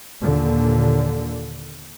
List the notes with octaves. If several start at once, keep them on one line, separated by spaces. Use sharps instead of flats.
D#2 A#2 D3